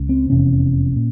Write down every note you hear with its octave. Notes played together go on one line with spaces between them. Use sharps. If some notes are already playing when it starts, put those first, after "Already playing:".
Already playing: C#2 C#3
C4
F1 E2 C3 C#4
A#2